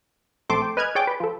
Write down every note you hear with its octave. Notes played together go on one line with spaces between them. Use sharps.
A#1 A3 C4 A5 C6 D6
G5
B4 D#5 G#5 F6 F#6 G#6
G#4 C#5 D5 G5 D6 G6
B4
F3 A4